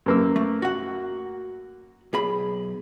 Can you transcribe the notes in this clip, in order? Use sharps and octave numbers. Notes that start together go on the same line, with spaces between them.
F#2 A#3 E6
A3
F#4 F#5
B1 G#4 B5